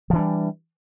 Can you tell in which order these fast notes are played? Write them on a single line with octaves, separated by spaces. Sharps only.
F3 E3 D4 G3